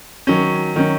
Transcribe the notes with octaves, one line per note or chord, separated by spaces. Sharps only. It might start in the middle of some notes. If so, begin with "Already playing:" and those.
D#3 F#3 C#4
D#3 F#3 C#4